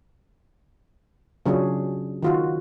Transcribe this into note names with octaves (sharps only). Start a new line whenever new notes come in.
C#3 F#3 C#4 D4 F4 G#4
D#3 F4 F#4